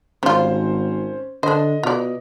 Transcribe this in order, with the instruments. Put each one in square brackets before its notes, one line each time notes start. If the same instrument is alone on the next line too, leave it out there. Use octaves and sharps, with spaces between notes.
[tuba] G#1 [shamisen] G3 F4 [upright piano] C#4 C5
[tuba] D3 [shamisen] D4 C5 [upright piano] D#5
[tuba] B2 [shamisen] F4 D5